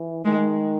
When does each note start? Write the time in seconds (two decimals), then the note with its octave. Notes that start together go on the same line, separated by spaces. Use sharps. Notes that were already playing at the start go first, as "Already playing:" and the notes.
Already playing: E3
0.25 D#3 G#3